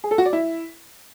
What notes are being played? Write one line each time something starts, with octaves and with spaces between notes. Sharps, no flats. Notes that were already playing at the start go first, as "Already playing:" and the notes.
G#4
A4
F#4
D5
E4